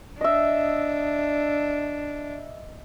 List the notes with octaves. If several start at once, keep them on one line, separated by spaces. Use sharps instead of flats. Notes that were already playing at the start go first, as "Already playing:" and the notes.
D4 D#5 E5